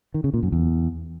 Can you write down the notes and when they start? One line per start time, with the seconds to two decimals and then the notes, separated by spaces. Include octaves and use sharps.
0.14 D#3
0.24 C#3
0.34 A#2
0.43 F#2
0.52 E2